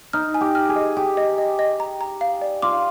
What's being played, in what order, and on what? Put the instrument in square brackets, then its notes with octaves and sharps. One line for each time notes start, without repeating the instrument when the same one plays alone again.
[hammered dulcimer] D#4 [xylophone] F6
[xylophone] G#5
[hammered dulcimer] G4
[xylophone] F6
[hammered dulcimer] G#4
[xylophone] D#5
[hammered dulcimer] G4 [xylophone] G5
[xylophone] D#5
D#5
D#5
A#5
A#5
F5
D5
[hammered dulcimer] F4 [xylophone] D6